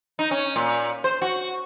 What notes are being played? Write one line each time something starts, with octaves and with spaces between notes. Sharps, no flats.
D#4
C#4
A#2
C5
F#4